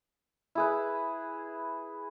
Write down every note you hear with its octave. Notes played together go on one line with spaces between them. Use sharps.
E4 G#4 B4